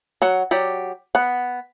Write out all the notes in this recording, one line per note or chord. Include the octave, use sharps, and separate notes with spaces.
F#3 F#4 F#5
F#3 G4 D5
B3 F#5